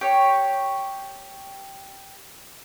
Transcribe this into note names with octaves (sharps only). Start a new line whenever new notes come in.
G4 C#5